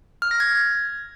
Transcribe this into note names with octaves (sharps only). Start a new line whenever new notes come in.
F6
A#6
G#6